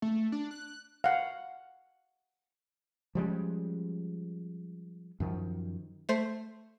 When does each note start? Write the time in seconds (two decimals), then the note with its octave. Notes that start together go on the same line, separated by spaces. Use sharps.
0.02 A3
0.32 D4
0.51 F#6
1.04 F5 F#5
3.15 F3 G3 G#3 C#4
5.20 F#2 D#3 F3
6.09 A3 C5